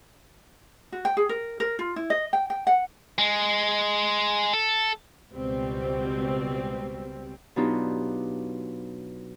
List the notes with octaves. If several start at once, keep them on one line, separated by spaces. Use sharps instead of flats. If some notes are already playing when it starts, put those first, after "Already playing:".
F#4
G5
G#4
A#4
A#4
F4
E4
D#5
G5
G5
F#5
G#3
A4
C#2 B2 G3 C4
B2 F#3 D4 D#4 F4 G4